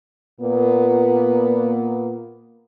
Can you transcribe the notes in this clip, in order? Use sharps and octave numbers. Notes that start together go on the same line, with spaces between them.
A#2 A#3 B3